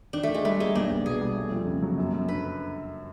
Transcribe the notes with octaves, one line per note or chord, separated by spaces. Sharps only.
D#3 D4
A3
D#3
G#3
G3 A3
G#3 A#3
B1 D4
B1
B2 G#4
G3
A3
F2
C#3
F#3
F#2
F#2
D3 B4